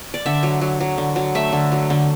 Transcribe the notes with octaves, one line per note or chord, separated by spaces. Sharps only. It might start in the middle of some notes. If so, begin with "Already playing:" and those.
D5
D3 E5
F#3
F#3
F#3
D3
F#3
A3 E5
D3
F#3
D3